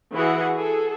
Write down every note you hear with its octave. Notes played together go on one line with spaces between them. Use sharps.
E3 F#4 G#4 F#5
G#4 A4